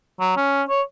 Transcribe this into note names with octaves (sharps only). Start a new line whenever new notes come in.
F#3
C#4
C#5